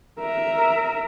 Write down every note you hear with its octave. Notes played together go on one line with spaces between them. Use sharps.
A#4 E5